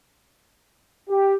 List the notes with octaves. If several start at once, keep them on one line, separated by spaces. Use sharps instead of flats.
G4